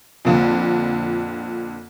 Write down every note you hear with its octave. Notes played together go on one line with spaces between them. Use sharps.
F2 A#2 D3